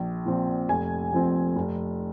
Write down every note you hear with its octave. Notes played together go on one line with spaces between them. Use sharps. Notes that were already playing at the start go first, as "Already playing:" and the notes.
Already playing: A#1
A#2 F3 C4
F1 G#5
F2 F3 C4
F1